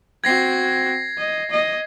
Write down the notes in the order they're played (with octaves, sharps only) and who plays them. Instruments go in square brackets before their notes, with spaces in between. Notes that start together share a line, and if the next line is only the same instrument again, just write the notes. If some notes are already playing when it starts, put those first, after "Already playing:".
[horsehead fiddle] C4 F#4 [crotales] G#6 A#6 C7
[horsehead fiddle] D#5
D#5